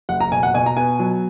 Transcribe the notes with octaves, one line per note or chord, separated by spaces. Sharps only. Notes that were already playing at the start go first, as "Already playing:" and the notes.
F#1 F#5
A#5
B2 G#5
F#5
B2 G#5
A#5
B3 G#5
F#3